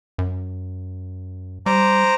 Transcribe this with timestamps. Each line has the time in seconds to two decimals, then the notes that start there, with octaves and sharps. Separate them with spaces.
0.18 F#2
1.66 G3 C5 A#5 D6